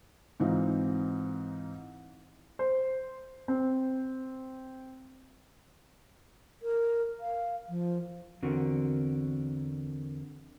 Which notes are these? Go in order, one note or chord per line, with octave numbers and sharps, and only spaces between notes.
G#2 E3 C4 D#4 F4
C5
C4
A#4
F5
F3
E2 D3 C4 F#4 A#4